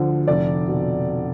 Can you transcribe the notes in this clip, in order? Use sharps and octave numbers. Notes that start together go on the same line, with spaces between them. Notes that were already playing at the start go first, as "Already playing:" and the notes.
Already playing: D2 D3 F3
F1 D5
B2